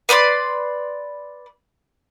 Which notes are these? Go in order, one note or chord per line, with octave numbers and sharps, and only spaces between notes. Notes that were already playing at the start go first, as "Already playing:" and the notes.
B4 D5 B5 C6